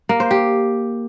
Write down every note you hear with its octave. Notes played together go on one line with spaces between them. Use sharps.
A#3
C5
G4